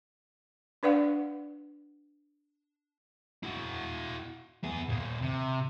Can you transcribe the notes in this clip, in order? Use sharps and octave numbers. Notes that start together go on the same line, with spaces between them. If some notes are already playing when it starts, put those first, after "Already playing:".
D4 B4 D5 F5 F#5
E4 F#4
B3 G#4
D#2 A#2
C3